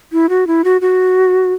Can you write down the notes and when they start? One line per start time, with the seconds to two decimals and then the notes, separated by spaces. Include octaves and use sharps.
0.12 E4
0.29 F#4
0.47 E4
0.64 F#4
0.81 F#4